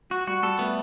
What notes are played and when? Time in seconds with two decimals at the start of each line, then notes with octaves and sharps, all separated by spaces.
0.10 F#3 F#4
0.27 G3 F#4
0.43 G3 A4
0.59 A3 B3